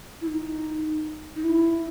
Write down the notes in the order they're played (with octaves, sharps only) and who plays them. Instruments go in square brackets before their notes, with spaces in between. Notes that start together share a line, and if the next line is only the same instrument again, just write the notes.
[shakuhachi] E4
D#4
D#4
E4